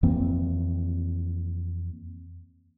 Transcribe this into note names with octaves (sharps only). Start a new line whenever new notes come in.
F2 E3 A#3 C4